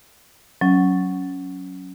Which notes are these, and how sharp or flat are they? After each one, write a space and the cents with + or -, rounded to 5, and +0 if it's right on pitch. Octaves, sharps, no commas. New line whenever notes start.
F#3 +0 C#4 +0